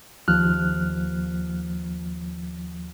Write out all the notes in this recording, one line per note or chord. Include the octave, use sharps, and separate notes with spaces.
D#2 F3 F6 F#6